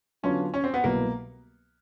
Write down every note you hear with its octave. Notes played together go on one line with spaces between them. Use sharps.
D3 F#3 B3 C#4 D4 F4
C#4
C4
B3
C2 B2 F#3 A#3 B3 E4